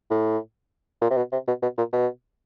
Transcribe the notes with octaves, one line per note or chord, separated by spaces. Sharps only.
A2
A#2
C3
B2
C3
B2
B2
A#2
B2